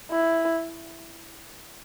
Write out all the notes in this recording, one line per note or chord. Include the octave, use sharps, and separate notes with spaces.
E4